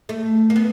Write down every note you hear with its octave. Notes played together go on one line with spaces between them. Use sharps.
A3
A#3
B3